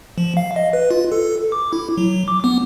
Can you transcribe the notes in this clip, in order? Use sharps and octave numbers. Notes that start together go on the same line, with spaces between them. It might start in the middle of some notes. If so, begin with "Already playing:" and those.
F3
F5
D#5
B4
F4
A4
D6
E4
F#3
D6
B3